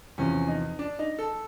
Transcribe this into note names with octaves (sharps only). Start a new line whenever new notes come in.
E2 C3 F3 C#4
D#4
D4
D#4
A4